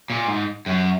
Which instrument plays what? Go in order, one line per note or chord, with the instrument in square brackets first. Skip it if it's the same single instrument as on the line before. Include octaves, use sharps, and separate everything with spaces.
[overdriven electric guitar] A#2
G#2
F#2